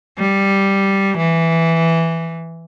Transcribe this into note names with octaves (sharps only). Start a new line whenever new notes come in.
G3
E3